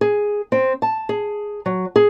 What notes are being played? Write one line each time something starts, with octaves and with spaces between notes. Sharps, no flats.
G#4
C4
A5
G#4
F#3
G#4